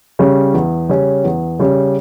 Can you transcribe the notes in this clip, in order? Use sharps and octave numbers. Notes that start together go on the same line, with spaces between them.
C#3 G3 C#4
E2
C#3 G3 C#4
E2
C#3 G3 C#4